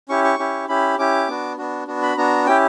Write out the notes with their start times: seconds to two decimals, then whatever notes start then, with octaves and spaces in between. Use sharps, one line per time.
0.09 C#4 E4 G4 C#6
0.24 C#6
0.39 C#4 E4 G4
0.68 C#4 E4 G4 B5
0.98 C#4 E4 G4 D6
1.28 B3 D4 F#4
1.57 B3 D4 F#4
1.87 B3 D4 F#4
2.02 B5
2.17 B3 D4 F#4 A#5
2.46 C#4 E4 G4 G5